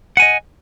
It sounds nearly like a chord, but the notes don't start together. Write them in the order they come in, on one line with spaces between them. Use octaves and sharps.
F#5 G#5 D#5